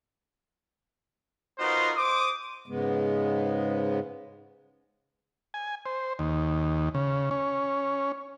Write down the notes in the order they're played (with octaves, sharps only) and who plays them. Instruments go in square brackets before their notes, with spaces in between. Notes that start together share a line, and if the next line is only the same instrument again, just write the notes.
[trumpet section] B3 D#4 F4 F#4 A#4 C5
C5 D6 D#6
[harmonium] G#2 C#3 G#3 B3
[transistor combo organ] G#5
C5
D#2
C#3
C#4